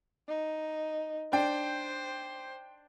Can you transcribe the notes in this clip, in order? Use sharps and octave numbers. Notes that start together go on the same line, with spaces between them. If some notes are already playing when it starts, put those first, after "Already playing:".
D#4
D4 C5 G5